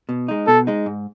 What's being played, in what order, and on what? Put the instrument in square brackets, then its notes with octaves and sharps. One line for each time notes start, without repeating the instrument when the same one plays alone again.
[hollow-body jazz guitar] B2
G#3 D#4
[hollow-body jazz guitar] B2 [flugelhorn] A4
[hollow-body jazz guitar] G#3 D#4
G#2